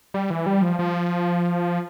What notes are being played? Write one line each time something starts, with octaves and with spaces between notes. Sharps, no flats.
G3
E3
G3
F3
F3